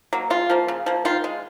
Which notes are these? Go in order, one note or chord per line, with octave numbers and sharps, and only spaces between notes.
F#3 A#3
C#3 F4
F3 A#3
C#3
F3 A#3
D#3 F4
G#3